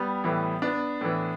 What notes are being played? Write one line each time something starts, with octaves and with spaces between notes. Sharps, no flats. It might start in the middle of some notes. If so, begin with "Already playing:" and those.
Already playing: G3 B3
A2 E3
B3 D4
A2 E3